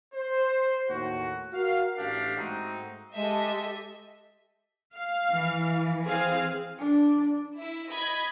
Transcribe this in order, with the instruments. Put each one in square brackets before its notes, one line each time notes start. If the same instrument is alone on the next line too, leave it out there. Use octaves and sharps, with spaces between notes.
[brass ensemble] C5
D#2 A2 F#4
F#4 A#4 F5
A1 A3 D4 G4 F5
G#2 A3 C4 D#4 F#4
[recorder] G#3 [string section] G4 A4 D#5 [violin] E5
[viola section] F5
[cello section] E3
[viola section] C4 G#4 F5
[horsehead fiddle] D4
[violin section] E4
D#5 B5 G#6